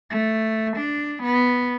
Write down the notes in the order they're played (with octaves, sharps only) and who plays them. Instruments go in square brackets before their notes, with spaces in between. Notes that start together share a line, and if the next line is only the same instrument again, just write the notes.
[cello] A3
D4
B3